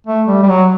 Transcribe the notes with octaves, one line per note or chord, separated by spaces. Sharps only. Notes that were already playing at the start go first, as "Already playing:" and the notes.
A3
G3
G3
F#3